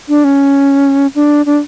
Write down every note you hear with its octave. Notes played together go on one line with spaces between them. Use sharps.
D4
C#4
D4
D4